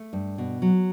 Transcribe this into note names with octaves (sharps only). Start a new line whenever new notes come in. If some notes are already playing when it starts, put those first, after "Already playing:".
Already playing: A3
G2
B2
F#3